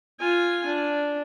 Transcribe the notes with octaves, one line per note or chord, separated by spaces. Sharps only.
F4 G#5
D4